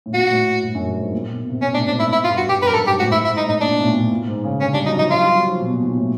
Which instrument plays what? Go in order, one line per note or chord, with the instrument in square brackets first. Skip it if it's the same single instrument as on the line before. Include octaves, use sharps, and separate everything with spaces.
[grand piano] A2
[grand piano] A#2 [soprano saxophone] F#4
[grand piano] A2
G2
F#2
G2
G#2
A#2
B2
B2
C3
[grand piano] B2 [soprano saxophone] C#4
[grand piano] A2 [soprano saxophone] D4
[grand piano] G#2 [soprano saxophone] D4
[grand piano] G#2 [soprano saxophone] E4
[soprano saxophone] E4
F4
[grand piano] G2
[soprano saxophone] F#4
[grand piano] G2
[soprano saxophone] G4
[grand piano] F#2 [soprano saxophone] B4
[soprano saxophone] A#4
[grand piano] G2 [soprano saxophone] A4
[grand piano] G#2 [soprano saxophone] G4
[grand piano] A2 [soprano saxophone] F#4
[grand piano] G#2
[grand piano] A2 [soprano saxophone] E4
[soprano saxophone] E4
[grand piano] G#2
[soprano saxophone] D#4
[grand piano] A2
[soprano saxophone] D#4
[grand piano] A#2 [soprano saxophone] D4
[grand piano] B2
A2
A#2
A2
A#2
G#2
C#3
[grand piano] D3 [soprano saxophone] C#4
[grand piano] G3 [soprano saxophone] D4
[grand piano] F#3 [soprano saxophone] D#4
[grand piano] F3 [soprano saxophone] D#4
[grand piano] F#3 [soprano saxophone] F4
[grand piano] G3
F#3
F3
B2
A#2
A#2
A2